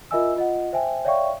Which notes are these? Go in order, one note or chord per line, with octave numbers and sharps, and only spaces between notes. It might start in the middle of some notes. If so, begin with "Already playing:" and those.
F4 A#4 D#5 E5 G#5 E6
F4 D#5 F#5
C5 E5 G5 G#5
C#5 D5 E5 F5 G5 C#6